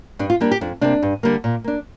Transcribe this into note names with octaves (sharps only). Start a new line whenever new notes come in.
G2 D4
F4
G3 A#3 D4
G4
F2 D4
C3 A#3 D4
G2
D3 G3 A#3
A#2
A#3 D4